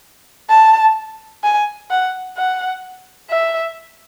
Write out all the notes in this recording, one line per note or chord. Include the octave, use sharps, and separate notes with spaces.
A5
G#5
F#5
F#5
E5